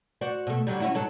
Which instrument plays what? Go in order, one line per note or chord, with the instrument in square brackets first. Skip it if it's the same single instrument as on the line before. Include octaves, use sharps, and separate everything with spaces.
[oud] F#4 C5 D5
B2 A3
D3 F#3 G3
C#4 E4 F#4
G#2 F#3 A4